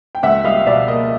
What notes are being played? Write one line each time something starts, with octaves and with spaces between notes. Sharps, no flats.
G5
C#2 E5 F#5
G3 D#5 F5
B2 D5 E5
A#3 D#5 F5